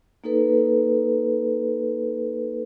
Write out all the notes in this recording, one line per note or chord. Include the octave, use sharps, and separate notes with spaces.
A#3 D#4 A4 B4